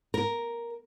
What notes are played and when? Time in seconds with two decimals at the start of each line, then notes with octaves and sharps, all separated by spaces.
0.14 A#4